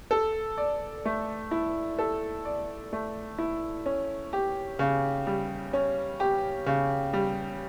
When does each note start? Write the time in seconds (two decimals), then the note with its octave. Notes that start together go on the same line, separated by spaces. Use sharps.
0.11 A4
0.57 D5
1.05 A3
1.51 E4
1.99 A4
2.45 D5
2.93 A3
3.38 E4
3.86 C#4
4.33 G4
4.79 C#3
5.27 G3
5.73 C#4
6.20 G4
6.66 C#3
7.13 G3